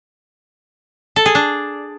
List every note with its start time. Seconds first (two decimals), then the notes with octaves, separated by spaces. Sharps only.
1.16 A4
1.26 G#4
1.35 D4